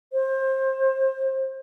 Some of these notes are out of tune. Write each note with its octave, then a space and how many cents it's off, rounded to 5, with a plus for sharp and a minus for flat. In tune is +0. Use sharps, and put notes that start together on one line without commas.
C5 +25